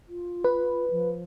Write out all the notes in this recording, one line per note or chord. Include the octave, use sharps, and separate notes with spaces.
F4
B4
F3